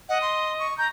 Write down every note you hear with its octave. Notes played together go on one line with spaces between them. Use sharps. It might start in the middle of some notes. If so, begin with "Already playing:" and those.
D#5 F#5
C6
C#6
A#5 G6